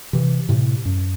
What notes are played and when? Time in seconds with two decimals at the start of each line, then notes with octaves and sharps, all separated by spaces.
0.13 C3 E3
0.49 A2 C3
0.85 F#2